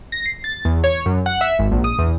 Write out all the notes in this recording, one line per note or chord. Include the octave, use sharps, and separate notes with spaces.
A#6
C7
A6
E2
C#5
F#2
F#5
E5
G#1
A#1
D#6
E2